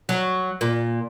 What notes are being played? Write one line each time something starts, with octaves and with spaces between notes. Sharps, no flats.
F#3
A#2